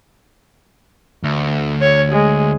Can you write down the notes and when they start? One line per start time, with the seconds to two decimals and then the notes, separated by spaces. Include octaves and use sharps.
1.24 D2
1.81 C#5
2.12 G#3